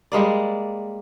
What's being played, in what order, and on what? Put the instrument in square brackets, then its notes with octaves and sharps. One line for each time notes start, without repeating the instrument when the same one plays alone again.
[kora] G3 G#3 A#3 D5